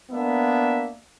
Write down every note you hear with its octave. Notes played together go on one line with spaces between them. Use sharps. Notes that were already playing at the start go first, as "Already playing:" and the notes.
A#3 B3 D4 E5